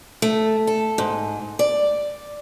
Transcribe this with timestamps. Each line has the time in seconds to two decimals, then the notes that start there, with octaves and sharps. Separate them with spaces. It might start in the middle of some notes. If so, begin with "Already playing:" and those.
0.22 A3
0.67 A4
0.98 G#2
1.59 D5